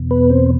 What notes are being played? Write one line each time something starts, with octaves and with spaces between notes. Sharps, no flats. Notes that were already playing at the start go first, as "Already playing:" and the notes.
Already playing: E2 B2
B3 B4
C4 C5